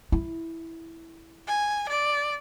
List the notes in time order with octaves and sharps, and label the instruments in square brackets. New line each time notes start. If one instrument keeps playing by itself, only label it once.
[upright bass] E4
[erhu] G#5
D5